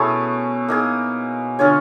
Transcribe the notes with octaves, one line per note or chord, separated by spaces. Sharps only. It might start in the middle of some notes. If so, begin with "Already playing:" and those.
Already playing: B2 A3 C#4 E4 G#4
A#3 D#4 G#4
D3 C#4 F4 G#4 C#5